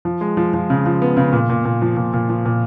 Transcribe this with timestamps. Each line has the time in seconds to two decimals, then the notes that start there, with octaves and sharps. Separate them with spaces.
0.05 F3
0.21 G#3
0.37 F3
0.54 F3
0.70 C#3
0.86 F3
1.02 B3
1.17 C#3
1.33 A#2
1.49 A#2
1.65 A#2
1.82 F3
1.97 A#2
2.13 A#2
2.29 F3
2.45 A#2